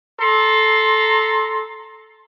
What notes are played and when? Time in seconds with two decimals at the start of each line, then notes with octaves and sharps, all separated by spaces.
0.20 A4 A#5 C6